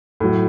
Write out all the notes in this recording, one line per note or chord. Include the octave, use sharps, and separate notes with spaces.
A2 F#3